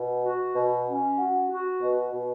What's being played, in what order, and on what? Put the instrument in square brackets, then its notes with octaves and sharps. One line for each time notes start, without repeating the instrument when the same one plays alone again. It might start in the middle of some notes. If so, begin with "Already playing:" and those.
Already playing: [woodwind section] B2
F#4
B2
C#4
F#4
F#4
B2
B2